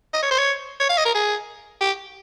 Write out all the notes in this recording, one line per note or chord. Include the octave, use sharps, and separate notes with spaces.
D#5
C#5
C5
C#5
C#5
F5
D#5
A#4
G#4
G4